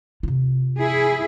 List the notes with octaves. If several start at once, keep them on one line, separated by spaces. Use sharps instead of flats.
C3 F4
E4 G#4